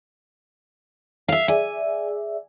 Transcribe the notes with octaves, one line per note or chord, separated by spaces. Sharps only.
E5 F5
G#4 D5 E5 G#5